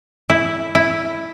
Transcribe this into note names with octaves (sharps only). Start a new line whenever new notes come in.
E4
E4